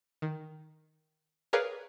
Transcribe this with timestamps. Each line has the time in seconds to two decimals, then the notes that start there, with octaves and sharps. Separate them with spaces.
0.22 D#3
1.53 G#4 A#4 B4 C#5 D5 F5